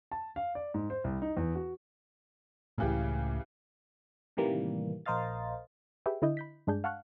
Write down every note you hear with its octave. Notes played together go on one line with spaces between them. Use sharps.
A5
F5
D5
G#2
C5
C2
D#4
E2
F#4
C#2 A2 C#3 E3 G4
A2 C3 D#3 E3 G3 A#3
A#1 A#4 C5 D#5 F5 A6
G4 G#4 B4 E5 G5
D3 E4 D#5 G6
B5 G6 B6
G2 G#3 D4 G#4 G6
F5 F#5 A5 C#6 F6 F#6